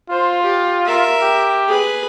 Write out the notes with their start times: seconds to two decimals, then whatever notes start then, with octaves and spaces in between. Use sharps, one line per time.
0.10 F4 C5
0.43 G4
0.85 A#4 E5
1.22 G4
1.68 G#4 B4